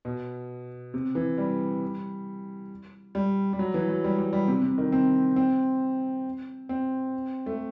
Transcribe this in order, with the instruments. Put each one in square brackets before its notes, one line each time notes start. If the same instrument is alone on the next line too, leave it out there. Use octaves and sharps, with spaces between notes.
[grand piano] B2
C3
E3
G3
G3
G3
F#3
E3
F#3
G3
G3
G3
C3
C3
D#3
C4
C4
C4
A3